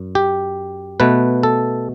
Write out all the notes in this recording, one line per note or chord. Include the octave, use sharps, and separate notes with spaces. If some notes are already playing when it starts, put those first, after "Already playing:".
Already playing: F#2
G4
B2 A3 B4
A4